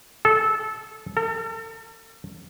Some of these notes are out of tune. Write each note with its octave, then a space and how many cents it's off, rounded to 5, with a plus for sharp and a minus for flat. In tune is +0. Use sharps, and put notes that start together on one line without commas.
A4 -20
A4 +40